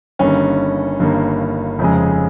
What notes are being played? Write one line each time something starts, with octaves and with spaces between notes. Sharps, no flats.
G1 G2 D#3 A#3 C#4
G1 G2 D#3 A#3
F1 F2 C#3 G#3